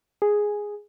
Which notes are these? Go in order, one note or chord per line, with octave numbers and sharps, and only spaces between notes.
G#4